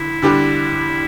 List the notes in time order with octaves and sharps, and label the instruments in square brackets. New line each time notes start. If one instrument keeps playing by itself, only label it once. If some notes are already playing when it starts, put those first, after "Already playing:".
Already playing: [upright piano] D3 [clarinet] E4
[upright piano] D3 G3 D4 G4